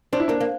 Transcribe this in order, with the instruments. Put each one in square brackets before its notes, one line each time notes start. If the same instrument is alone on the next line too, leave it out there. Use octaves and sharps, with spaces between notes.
[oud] C4 [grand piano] D4
[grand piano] E4
[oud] A#3 [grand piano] D4
[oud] A#3